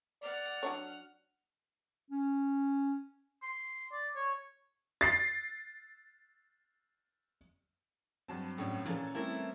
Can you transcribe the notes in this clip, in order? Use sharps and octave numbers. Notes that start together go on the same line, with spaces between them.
D5 F#5 F6
F#3 D4 C#5
C#4
C6
D5
C#5
A6 C7
G2 F#3 C4 A5
A2 C#4 D4
A#2 E3 C#4 A4
G3 A3 C4 E4 A#4